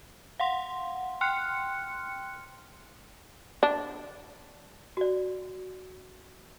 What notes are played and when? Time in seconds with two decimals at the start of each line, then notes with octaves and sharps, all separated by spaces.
0.40 F5 F#5 C6
1.21 G5 C6 F6 F#6 C#7
3.63 D4
4.97 F#4 D5